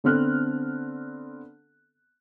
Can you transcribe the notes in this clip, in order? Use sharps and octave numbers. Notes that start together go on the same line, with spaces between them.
D3 B3 C4 A4 F6 F#6